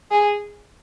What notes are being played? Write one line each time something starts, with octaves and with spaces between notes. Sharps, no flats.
G#4